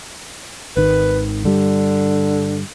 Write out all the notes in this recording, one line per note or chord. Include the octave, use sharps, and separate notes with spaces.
G#1 D#3 B4
G2 D3 G3